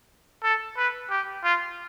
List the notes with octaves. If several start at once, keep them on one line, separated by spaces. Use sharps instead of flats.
A4
B4
G4
F4